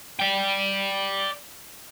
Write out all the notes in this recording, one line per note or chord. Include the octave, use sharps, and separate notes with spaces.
D5 G5